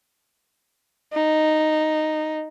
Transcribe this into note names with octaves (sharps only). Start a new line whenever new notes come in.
D#4